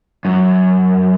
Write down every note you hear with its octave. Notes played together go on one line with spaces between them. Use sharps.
F#2